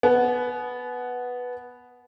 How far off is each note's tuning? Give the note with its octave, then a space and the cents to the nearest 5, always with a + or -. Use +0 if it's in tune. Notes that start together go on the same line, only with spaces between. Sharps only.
B3 +0 G#5 +45